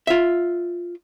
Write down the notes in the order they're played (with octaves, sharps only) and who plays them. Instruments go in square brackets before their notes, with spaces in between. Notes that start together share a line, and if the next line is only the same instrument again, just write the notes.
[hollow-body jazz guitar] F4 E5